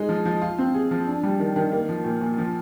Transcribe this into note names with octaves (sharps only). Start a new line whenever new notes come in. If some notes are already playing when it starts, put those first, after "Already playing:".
Already playing: G#3 D#4
F3
F3
F4
C4
G#4
F3
D4
G3
D#3
D#3
A#3
F3
A#2
A#2
F3